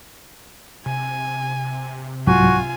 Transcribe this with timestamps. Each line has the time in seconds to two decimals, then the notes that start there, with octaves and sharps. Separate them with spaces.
0.86 C3 G#5
2.27 C2 G#2 F#3 F4 F#4 G#5